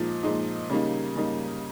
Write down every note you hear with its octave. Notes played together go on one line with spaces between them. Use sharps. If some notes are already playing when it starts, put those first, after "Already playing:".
Already playing: A#2 F3 G#3 D#4
A#2 F3 G#3 D#4
C#3 G3 A#3 D#4
C#3 G3 A#3 D#4